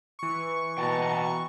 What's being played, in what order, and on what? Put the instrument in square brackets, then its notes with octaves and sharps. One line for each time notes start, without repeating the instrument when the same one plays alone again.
[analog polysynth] E3 C#6
[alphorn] B2 [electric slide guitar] G5 A5 A#5